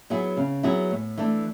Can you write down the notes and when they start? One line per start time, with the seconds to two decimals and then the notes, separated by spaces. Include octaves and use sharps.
0.10 F#3 B3 E4 G#4
0.37 C#3
0.63 F#3 B3 E4 G#4
0.91 A2
1.18 E3 A3 D4